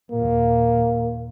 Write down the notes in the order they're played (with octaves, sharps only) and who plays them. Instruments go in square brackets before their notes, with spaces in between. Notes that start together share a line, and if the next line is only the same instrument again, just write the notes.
[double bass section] D#2 A#2 [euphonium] A#3